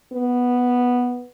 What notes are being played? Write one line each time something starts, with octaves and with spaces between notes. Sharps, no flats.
B3